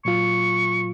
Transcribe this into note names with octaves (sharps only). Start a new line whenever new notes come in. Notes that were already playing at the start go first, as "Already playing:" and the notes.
A#2 F#3 F4 C#6